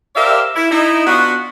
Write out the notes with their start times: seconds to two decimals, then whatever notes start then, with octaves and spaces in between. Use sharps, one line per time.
0.16 G4 A#4 C5 D5 E5 F5
0.56 E4
0.71 D#4 E4
1.07 B3 D4 F4 F#4